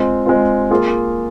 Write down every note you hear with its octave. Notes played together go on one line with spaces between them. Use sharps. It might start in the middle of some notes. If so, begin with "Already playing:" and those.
Already playing: G#3 C4 F4
G#3 C4 F4
A#3 F4 G#4